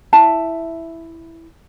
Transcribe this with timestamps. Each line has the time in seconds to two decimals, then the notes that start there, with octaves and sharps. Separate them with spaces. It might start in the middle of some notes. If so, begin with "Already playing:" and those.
0.13 E4 E5 A5